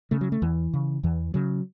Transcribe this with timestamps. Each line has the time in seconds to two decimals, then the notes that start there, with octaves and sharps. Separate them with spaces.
0.11 C#3 A3
0.21 F#3
0.32 A3
0.42 E2 E3
0.74 C#3
1.03 E2 E3
1.34 C#3 F#3